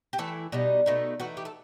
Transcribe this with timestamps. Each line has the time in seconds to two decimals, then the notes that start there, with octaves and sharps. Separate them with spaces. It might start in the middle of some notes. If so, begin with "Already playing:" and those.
0.13 G4
0.18 E3 A3 E4 A4
0.52 B2 G3 D#4
0.86 B2 A3 D#4
1.20 E3 A3 D#4 F#4
1.37 G4
1.45 A4